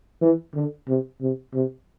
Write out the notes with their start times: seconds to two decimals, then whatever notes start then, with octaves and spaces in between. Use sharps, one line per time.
0.21 E3
0.54 D3
0.88 C3
1.21 C3
1.54 C3